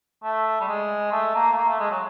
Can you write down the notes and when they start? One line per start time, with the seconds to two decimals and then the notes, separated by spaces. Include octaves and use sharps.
0.23 A3
0.60 G3
0.68 G#3
1.12 A3
1.35 A#3
1.52 A3
1.57 A#3
1.69 A3
1.80 G#3
1.91 F#3